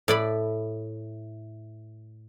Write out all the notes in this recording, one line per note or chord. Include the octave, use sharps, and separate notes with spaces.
A2 D5 B5